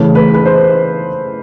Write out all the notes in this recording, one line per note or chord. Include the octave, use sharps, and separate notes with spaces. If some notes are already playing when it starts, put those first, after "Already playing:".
Already playing: C#3 E3 A3
B4
B4
C5